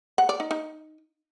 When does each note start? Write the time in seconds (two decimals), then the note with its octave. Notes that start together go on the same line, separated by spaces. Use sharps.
0.18 F#5
0.29 D5
0.40 D#4
0.51 D#4